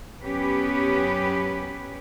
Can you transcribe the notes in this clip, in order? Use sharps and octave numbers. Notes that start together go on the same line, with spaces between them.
F#2 B3 C#4 G4 B4